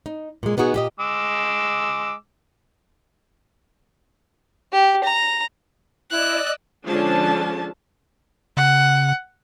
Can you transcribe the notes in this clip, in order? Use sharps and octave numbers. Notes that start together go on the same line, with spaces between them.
D#4
A#2 G#3
B2 B3 D#4 F#4 G#4
A#2 G4 D#5
G#3 D6 E6
G4
A#5
E4 D5 D#5 E6 F#6
D3 F3 G#3 C#4 D4 A5
C#3 F#5